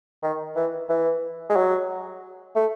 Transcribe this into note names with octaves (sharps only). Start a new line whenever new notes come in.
D#3
E3
E3
G#3
F#3
A3